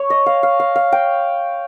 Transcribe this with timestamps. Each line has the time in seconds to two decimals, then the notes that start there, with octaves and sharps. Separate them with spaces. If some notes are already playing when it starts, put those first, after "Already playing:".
Already playing: C#5
0.10 D#5
0.26 F5
0.43 F5
0.60 F5
0.76 F5
0.92 G5